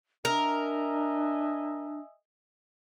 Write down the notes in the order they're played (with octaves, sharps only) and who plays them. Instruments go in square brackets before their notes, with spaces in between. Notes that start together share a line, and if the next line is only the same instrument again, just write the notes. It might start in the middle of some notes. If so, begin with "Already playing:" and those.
[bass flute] D4 [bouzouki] A#4 [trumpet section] D#5 E5 G#5